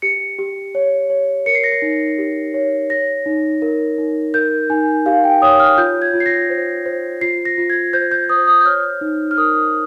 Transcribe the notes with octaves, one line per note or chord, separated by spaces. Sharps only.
G4 C#7
G4
C#5
C#5
A#4 C#7
C7
A#6
C7
D#4
G4
C#5
C#5 A#6
D#4
A#4
D#4
A#4 G6
D#4 G#5
G4 F5
G5
C#5 D#6
F6
F4 G6
G#6
F4
C7
A#6
C5
C5
F4 C7
A#6
F4
G#6
C5 G6
G6
C5 D#6
D#6
G6
C#5 F6
D#4
F6
A#4 D#6